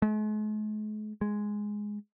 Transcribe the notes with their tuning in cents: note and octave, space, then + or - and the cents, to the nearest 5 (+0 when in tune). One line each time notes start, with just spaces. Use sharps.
G#3 +45
G#3 +0